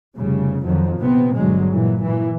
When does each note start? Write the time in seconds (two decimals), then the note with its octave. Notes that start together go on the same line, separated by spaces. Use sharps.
0.16 F1 C#3 G3
0.63 F2 D#3 F3 F#3
1.00 A#1 C3 B3 C4
1.35 G1 G2 B2 D3 F#3 G#3
1.71 A#2 E3 F#3
2.02 A#2 E3